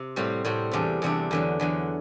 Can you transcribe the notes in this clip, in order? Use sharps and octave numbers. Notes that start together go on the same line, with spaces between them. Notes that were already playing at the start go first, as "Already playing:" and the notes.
Already playing: C3
A2 G3 C4 F#4
A2 G3 C4 F#4
E2 C3 G3 D4
E2 C3 G3 D4
E2 D3 F#3
E2 D3 F#3